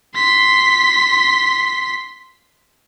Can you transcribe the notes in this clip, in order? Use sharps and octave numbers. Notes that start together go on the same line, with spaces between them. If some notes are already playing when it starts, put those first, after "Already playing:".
C6 B6